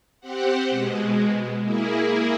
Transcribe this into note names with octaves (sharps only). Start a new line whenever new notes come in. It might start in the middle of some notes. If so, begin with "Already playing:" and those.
C4 G4 C5 F#5
B2 G#3
A#3 E4 G#4